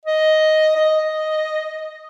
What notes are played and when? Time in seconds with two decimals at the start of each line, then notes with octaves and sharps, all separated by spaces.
0.05 D#5
0.76 D#5